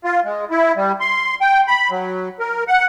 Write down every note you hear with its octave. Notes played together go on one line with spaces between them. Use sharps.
F4
G#3
E4
G3
C6
G5
B5
F#3
A#4
F#5